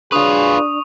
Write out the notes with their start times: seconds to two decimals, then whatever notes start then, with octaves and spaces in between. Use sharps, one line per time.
0.12 F#3 D4 F4 G#4 B4 C#6 D#6 F7